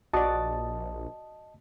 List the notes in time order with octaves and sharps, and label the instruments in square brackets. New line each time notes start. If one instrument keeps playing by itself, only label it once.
[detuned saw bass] A#1 [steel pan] F#4 D5 [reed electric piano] D#5 A5 D#6